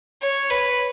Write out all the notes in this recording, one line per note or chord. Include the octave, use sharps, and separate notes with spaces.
C#5
B4